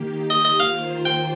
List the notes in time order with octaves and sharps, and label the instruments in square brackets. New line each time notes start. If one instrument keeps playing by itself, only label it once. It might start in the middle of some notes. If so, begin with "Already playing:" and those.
Already playing: [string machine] D#3 A#3 G4
[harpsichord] D#5
D#5
[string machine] D#2 D#3 A#3 F4 C5 [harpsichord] F5
[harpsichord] G5